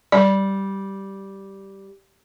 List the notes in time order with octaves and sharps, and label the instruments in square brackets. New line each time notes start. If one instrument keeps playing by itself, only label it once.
[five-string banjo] G3 [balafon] D5